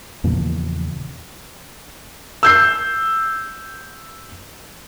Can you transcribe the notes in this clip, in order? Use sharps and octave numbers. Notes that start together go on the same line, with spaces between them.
E2 A#2 C#3 F3
E6 G6 C7